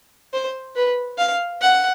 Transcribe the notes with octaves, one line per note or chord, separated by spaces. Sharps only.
C5
B4
F5
F#5